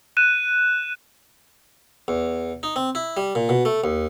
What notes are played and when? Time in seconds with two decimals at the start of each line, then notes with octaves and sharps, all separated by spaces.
0.17 F#6 D#7 E7
2.08 E2
2.63 D#4
2.76 C4
2.95 E4
3.17 G3
3.35 A#2
3.49 B2
3.65 A3
3.84 D#2